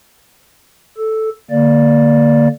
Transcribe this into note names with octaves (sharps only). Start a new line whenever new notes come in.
A4
D3 A#3 D5